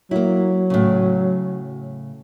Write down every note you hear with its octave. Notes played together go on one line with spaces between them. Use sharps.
F#3 A#3 E4
A2 C#3